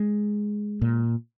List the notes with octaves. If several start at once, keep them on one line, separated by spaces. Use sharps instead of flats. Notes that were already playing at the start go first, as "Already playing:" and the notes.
Already playing: G#3
A#2